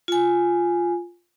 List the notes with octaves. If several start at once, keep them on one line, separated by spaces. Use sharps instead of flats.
F4 G#5